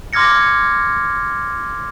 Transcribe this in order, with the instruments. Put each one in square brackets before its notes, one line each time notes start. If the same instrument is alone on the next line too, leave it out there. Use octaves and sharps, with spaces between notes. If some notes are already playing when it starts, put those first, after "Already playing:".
[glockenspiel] C6 D6 F6 G#6 A#6 C#7